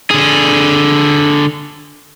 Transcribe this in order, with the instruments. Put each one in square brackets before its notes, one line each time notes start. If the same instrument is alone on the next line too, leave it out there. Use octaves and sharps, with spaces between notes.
[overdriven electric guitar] D3 G#4